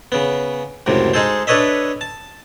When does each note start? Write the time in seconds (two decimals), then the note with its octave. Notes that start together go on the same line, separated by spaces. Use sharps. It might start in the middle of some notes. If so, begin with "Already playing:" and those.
0.12 C#3 B3
0.86 C#2 F#2 A2 C3
1.14 G#3 D#4 G#4 A4 C5
1.47 D4 A4 B4 C#5 D#5 E5
2.01 A5